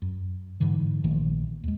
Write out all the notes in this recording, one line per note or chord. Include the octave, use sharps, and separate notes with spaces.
F#2
G#2 D3 E3 F#3
A#1 D#3 F3 A3
D#2 G#3